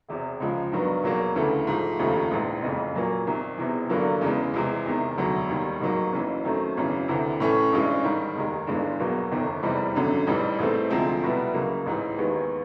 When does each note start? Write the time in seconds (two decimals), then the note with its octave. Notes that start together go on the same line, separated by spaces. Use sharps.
0.08 E1 E2 C3
0.40 C#2 C#3 F3 G#3
0.72 G2 D#3 F#3 B3
1.04 E2 B2 F#3 A#3
1.36 D2 C#3 E3 A3
1.67 G#2 F3 A3
1.99 F1 D#2 C#3 F3 A3
2.31 A#1 G#2 E3 G#3
2.62 F#1 F2 C#3
2.95 A#2 F#3 A#3
3.27 C2 C3 D#3
3.58 E1 E2 C3 E3
3.90 G2 D3 F#3 A#3
4.21 E2 C#3 E3 G#3
4.54 C2 C3 E3 G#3
4.85 E2 C3 D#3
5.17 E1 D2 D3 F#3
5.49 D#2 D#3 G3
5.80 A1 G#2 D#3 F#3 A#3
6.12 F#1 F#2 C#3 E3
6.45 F#2 D#3 F#3 A3 C4
6.77 G#1 F#2 C#3 E3
7.08 D2 C3 E3
7.40 A2 E3 A3 C#4
7.73 A1 G2 E3 G#3 C#4
8.04 G#2 D#3 G3
8.35 F1 D#2 D#3 G#3
8.67 G1 G2 E3 G#3
9.00 E2 B2 F#3 A#3
9.31 G1 F2 C3 D#3
9.63 F1 E2 C3 E3 G3
9.95 G#1 F#2 D3
10.27 A1 G#2 E3 G3
10.59 A1 G#2 E3 A3 C4
10.90 D2 C3 F3 G#3 C4
11.23 C2 B2 G3 B3 E4
11.54 C#2 C#3 F#3 A#3
11.86 A1 G#2 E3
12.17 D#2 D#3 G#3 B3